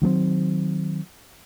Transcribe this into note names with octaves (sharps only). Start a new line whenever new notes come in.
D#3 F#3 A3 C4